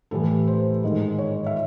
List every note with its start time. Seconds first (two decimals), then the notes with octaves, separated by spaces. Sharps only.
0.11 A2 E3 G3 A4
0.48 C5
0.83 G#2 D#3 G#3
1.18 C#5
1.46 E5